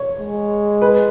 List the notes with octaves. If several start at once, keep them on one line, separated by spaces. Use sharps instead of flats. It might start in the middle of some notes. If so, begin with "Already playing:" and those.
Already playing: C#5
G#3
B4